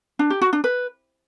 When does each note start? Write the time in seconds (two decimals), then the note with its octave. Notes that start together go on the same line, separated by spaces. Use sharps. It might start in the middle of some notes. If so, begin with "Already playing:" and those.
0.19 D4
0.30 G4
0.42 F#4
0.53 D4
0.64 B4